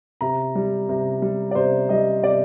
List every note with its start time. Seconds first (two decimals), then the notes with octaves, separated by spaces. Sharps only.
0.21 C3 A#5
0.55 G3
0.89 C3
1.22 G3
1.51 D5
1.55 C3 C5
1.89 G3 D#5
2.23 C3 D5